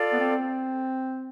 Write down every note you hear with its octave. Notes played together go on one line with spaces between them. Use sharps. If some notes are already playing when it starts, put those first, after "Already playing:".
Already playing: F4 A4 D5
B3
C4